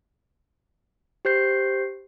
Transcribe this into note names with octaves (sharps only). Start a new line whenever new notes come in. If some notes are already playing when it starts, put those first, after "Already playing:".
G4 C5 G6 C7